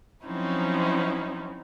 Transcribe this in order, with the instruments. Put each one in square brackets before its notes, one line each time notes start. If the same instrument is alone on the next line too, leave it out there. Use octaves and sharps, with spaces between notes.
[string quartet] F3 F#3 C4 C#4 D#4 E4